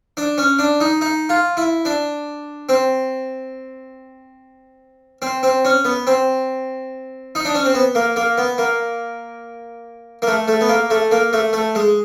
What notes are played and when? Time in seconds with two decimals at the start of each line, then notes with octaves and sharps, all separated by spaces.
0.17 D4
0.38 C#4
0.59 D4
0.80 D#4
1.01 D#4
1.29 F4
1.57 E4
1.85 D4
2.69 C4
5.22 C4
5.43 C4
5.65 C#4
5.85 B3
6.07 C4
7.35 D#4
7.45 D4
7.55 C#4
7.65 C4
7.74 B3
7.95 A#3
8.16 A#3
8.38 B3
8.58 A#3
10.22 A#3
10.27 A3
10.48 A3
10.61 B3
10.69 A#3
10.90 A3
11.12 A#3
11.33 A3
11.53 A3
11.75 G#3